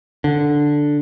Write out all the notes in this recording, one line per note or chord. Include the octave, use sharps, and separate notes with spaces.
D3